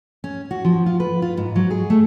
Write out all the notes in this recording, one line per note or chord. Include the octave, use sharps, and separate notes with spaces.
C#4
F#4
F3
F4
B4
F4
G#2
F#3
G#4
A3